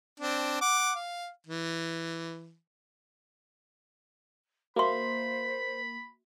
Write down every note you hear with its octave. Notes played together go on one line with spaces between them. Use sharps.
C4 D4
F#5 D6
F5
E3
A#3 F#4 C5 E5 B5 C6